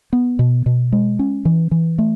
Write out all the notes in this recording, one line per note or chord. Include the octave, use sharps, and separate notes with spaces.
B3
B2
B2
G#3
C#4
E3
E3
A3